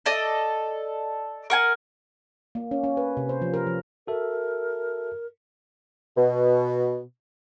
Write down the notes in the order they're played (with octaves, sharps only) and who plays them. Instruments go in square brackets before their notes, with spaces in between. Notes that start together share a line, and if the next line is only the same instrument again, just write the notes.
[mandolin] A4 D5 D#5
A#4 F#5 G#5
[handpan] A#3
C#4
C#4
B4
C3
C5
F3
A#4
F3
[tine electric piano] F#4 A4 E5 [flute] A#4
[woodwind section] B2